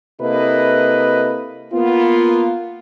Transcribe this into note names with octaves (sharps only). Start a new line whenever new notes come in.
C3 A#3 E4 A4 B4 D#5
A#3 B3 F4